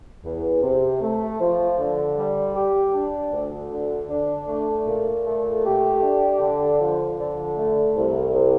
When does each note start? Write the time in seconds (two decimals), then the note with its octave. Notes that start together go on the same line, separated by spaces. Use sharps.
0.24 E2
0.62 C3
1.01 A3
1.40 F3
1.79 D3
2.16 G3
2.55 G4
2.94 D4
3.33 D2
3.71 D3
4.10 D4
4.48 A3
4.86 A#2
5.25 A3
5.64 G4
6.02 D4
6.40 D3
6.80 F3
7.19 D3
7.57 A3
7.96 C2
8.33 C3